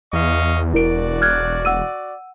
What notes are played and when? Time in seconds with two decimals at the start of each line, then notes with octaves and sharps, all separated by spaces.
0.13 E2 D#5 F5 C#6
0.74 E1 E4 F#4 A#4 D5 D7
1.22 F6 F#6 G#6
1.65 F#5 E6 D#7